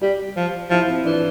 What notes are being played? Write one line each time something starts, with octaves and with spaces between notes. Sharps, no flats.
G3 G4
F3
F3 E4
C4
E3 D4